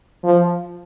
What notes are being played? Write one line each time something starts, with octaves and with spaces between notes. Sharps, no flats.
F3